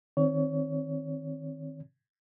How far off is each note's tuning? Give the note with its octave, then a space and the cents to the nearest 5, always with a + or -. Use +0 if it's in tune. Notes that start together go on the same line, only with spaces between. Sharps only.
D#3 +0 C4 +15 C#5 +30